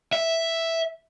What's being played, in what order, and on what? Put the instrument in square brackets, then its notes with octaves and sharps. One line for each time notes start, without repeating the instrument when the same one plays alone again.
[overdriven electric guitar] E5